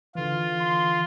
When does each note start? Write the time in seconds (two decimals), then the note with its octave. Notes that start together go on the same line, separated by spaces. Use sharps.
0.15 D3 E3 F4
0.60 C6